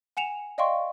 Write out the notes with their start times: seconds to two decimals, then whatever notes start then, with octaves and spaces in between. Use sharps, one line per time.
0.17 F#5 G#5 C#7 E7 F7
0.58 D5 D#5 F5 G5 C6 C#6